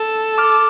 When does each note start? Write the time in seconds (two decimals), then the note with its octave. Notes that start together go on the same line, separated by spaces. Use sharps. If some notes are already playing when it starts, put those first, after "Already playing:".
Already playing: A4
0.38 D6 F6